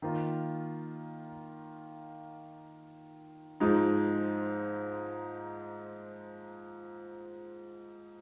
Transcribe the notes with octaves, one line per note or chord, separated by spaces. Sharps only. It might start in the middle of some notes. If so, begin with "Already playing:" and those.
D#3 A#3 F4
G#2 F3 G#3 D#4